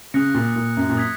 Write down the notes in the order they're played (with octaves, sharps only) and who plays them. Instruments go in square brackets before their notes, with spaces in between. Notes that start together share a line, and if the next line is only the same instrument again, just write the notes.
[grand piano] C#3 [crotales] D#6 F#6 A#6 C#7
[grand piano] A#2
A#2
F#2
A#2
[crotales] D#6 G#6 B6